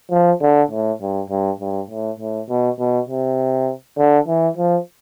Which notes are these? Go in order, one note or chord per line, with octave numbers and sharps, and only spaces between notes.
F3
D3
A2
G2
G2
G2
A2
A2
B2
B2
C3
D3
E3
F3